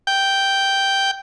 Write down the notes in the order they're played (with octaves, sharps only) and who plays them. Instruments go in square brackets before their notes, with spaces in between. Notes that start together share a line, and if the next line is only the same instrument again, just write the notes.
[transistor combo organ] G5